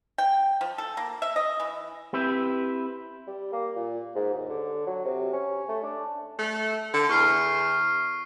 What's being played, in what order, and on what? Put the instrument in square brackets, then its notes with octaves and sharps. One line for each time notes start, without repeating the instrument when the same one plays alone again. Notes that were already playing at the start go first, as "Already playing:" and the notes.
[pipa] G5
F3
A4
A#3
E5
D#5
E3
[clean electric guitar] C4 E4 G4 B4
[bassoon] G3
A#3
A#2
G#2
D#2
D3
F#3
C3
C#4
A3
D4
[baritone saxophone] A3
D3
[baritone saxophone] E2 [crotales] C#6 F6 C7